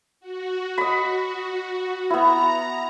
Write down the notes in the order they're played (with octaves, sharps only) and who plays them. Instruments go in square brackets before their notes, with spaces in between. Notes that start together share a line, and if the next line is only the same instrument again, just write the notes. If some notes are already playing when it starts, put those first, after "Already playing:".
[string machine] F#4
[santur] D#5 B5
[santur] B3 E4 [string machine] A#5